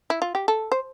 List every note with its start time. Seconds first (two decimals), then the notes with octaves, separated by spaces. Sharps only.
0.10 E4
0.22 F4
0.35 G4
0.48 A4
0.72 C5